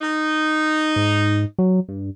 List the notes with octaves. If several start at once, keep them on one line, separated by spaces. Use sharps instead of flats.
D#4
G#2
F#3
G2